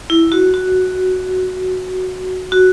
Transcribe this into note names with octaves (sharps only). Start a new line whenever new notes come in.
E4
F#4
F#4
F#4